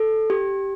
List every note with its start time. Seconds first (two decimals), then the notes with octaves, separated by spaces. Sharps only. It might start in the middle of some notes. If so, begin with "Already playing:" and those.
Already playing: A4
0.30 G4